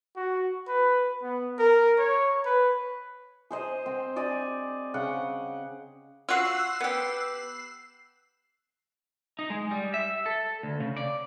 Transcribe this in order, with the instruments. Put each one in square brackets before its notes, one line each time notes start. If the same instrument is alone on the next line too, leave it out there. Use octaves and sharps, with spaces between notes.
[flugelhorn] F#4
B4
B3
A#4
C#5
B4
[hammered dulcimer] G#4 C5 D#5
C4
D5 D#5 G#5
C#3 F#5 G5
[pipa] F4 F#4 [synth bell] E6 F#6 C7
[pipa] B3 G4
[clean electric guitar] D#4
G#3
G3
E5
A4
D2
C#3
D5